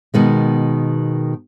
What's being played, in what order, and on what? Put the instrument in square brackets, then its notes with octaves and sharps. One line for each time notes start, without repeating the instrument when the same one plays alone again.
[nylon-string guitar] B2 D#3 G#3